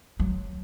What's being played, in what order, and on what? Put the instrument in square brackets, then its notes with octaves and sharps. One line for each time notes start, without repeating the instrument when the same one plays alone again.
[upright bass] F#3